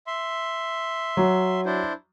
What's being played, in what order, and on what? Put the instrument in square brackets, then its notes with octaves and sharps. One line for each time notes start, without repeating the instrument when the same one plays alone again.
[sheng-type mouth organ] E5 C6
[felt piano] F#3
[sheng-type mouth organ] D4 E4 C5